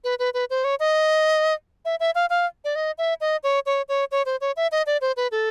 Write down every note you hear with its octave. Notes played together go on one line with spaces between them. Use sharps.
B4
B4
B4
C5
C#5
D#5
E5
E5
F5
F5
D5
D#5
E5
D#5
C#5
C#5
C#5
C#5
C5
C#5
E5
D#5
D5
C5
B4
A4